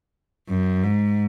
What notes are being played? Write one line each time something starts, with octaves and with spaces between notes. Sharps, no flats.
F#2
G#2